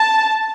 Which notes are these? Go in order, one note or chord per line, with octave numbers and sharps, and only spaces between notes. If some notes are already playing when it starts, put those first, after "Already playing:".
Already playing: A5